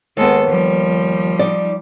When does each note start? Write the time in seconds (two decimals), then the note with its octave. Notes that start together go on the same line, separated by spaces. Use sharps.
0.17 D#2 G#3 B3 A4
0.47 F3 G3
1.39 D#4 D5